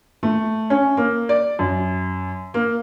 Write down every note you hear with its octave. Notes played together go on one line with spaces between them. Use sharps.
A3
C#4
A#3
D5
F#2
A#3